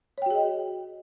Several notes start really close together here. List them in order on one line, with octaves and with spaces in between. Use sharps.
C#5 G5 F#4 G#4 D#5